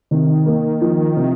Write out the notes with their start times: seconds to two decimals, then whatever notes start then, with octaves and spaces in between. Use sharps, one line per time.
0.11 C3 D#3
0.46 A#3
0.82 F3
1.17 C3